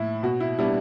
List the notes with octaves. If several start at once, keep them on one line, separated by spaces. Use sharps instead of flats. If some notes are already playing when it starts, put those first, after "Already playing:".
Already playing: A2 E4
B2 F#4
E4
G3 B3 D4 E4